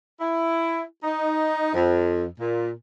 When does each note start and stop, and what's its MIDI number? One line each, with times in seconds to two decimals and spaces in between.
0.19 0.82 64
1.03 1.73 63
1.74 2.24 41
2.37 2.70 46